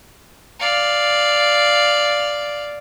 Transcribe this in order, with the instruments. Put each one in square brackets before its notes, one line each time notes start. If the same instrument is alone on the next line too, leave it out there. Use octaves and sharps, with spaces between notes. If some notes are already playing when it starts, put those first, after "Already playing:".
[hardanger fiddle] D5 F5